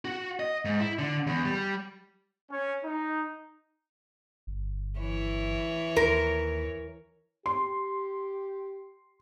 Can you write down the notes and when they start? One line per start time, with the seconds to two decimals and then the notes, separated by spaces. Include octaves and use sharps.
0.05 F#4
0.40 D#5
0.65 G#2
0.80 E4
0.99 D3
1.27 E2
1.45 G3
2.51 C#4
2.84 D#4
4.47 G1
4.99 E3 E4 C#5
5.96 D#2 A#4
7.46 G4 C6